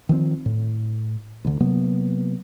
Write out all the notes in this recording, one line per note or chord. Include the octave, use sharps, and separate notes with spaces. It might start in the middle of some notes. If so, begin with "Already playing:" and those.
D#3 F3 G3 C4
A2
D2 D3
C3 F#3 A#3 B3